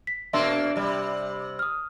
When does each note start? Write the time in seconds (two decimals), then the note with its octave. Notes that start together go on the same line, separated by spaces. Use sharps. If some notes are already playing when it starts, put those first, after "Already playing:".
0.07 B6
0.33 B2 A#3 D4 E5 C6 E6
0.76 C3 G3
1.59 D#6 F6